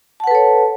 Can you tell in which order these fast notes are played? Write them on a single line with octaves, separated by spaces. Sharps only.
A5 F#5 B4 A4 C#5